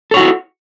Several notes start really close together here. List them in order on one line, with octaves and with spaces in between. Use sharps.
A4 C#5 F#4 E4